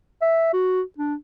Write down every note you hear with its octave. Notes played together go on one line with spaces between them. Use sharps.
E5
F#4
D4